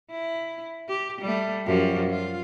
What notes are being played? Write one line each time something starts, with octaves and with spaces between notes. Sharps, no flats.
E4
G4
G3 A3
F#2 F3 G4
F4